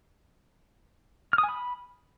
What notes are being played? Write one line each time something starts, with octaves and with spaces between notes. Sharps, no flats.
F6
D#6
G#5
B5